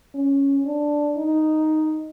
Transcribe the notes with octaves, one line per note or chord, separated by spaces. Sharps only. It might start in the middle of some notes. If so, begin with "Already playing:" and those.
C#4
D4
D#4